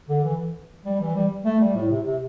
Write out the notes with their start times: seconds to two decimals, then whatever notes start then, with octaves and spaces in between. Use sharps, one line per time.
0.09 D3
0.24 E3
0.85 G3
1.01 E3
1.15 G3
1.45 A3
1.60 G3
1.75 A2
1.90 C3
2.06 C3